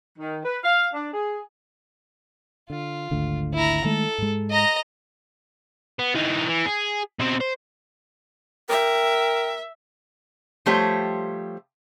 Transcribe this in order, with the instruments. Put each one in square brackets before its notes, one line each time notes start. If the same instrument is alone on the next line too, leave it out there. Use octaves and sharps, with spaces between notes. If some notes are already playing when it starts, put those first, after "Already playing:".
[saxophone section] D#3
B4
F5
D4
G#4
[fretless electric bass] D3 [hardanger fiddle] F4
[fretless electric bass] G#1 D2 D3
[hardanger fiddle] E4 A#5
[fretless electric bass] D#3 G#3 A3 [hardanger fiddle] A4
[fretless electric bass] G#2 G#3
[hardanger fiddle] D#5 A#5
[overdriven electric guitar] B3
E3 D#4
E3
G#4
B2 C4
C5
[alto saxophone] A#4 [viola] E5 [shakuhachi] G5
[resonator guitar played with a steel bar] F3 G3 A3 G4 C5 C#5